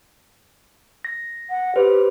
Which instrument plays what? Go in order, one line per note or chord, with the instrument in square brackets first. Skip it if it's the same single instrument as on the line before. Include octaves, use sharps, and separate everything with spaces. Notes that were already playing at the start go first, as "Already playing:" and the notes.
[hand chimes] A#6
[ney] F#5
[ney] G4 [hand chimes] B4 C5